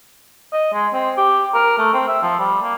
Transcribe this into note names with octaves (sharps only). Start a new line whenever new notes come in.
D#5
G#3
C4
G4
A#4
A3
C4
E5
F3
G3
A#3